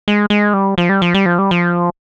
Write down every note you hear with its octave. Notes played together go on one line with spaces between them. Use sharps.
G#3
G#3
G3
F3
G3
F3
G3
F3
G3
F3